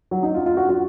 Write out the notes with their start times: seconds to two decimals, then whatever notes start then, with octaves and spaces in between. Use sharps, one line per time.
0.11 F#3
0.23 D#4
0.34 F4
0.46 F4
0.57 F#4
0.69 F#4